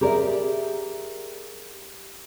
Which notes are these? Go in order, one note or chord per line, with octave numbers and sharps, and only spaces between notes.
G4 G#4 A#4 C#5 D5 E5